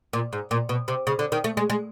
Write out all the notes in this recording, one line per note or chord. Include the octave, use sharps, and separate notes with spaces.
A#2
G#2
A#2
B2
C3
C#3
D3
D#3
A3
G#3
G#3